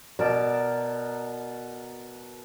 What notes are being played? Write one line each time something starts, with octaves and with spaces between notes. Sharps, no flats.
B2 A#4 D5 A5